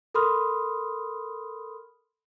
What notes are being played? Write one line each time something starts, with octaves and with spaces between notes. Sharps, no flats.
A4 A#4 B5 C6 D#6 F6